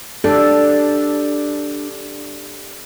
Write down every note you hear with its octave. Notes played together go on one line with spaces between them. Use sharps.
G3 D4 A4